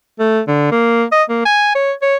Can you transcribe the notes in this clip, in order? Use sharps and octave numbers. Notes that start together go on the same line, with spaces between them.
A3
D3
A#3
D#5
A#3
G#5
C#5
C#5